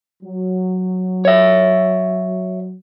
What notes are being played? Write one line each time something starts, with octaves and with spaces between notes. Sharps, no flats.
F#3
C#5 E5